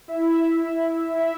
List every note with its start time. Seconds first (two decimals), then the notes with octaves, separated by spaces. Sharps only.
0.08 E4 E5
1.19 E4 E5